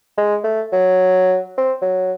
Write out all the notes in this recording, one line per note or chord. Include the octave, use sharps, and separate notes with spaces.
G#3
A3
F#3
C4
F#3